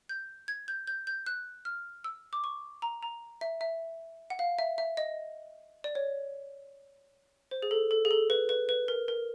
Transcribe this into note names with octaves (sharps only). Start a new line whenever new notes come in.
G6
G#6
G6
G6
G6
F#6
F6
E6
D6
C#6
A#5
A#5
E5
E5
F#5
F5
E5
E5
D#5
D5
C#5
C5
G#4
A4
A4
G#4
A4
B4
B4
B4
A#4
A#4